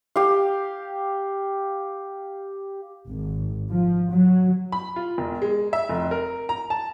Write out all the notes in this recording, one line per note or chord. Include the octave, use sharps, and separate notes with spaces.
G4 F5
G#1
F3
F#3
B5
F4
E1
G#3
E5
F1
A#4
A#5
A5